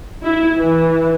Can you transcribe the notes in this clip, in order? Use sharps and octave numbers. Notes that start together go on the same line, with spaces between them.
E4
E3